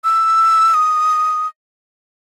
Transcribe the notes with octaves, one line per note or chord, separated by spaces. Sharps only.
E6
D#6